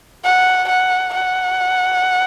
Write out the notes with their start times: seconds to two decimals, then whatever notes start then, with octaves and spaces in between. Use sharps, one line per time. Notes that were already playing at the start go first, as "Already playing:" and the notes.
0.24 F#5
0.69 F#5
1.14 F#5